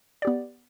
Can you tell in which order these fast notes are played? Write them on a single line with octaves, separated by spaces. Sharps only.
D5 G4 B3